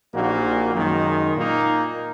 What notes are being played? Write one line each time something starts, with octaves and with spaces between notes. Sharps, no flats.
A#1 A#2 A#3 D#4 F#4
F#2 D#3 G#3 D#4
A#2 A#3 D#4